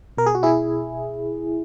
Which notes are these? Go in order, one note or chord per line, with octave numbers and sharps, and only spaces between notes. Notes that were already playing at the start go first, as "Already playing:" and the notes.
B2 A#4
G#4
F#4
E4 G#4